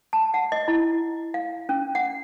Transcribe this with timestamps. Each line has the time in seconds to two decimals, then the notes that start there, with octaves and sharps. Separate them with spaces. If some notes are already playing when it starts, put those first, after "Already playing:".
0.13 A5
0.34 F#5
0.52 D#5
0.68 E4
1.34 F5
1.69 C#4
1.95 F#5